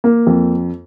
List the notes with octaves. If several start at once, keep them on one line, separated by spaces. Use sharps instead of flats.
A#3
F2